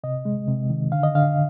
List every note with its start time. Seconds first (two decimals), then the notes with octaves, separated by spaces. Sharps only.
0.04 C3 D#5
0.25 G#3
0.48 C3
0.70 D#3
0.92 D3 F5
1.03 D#5
1.15 D3 F5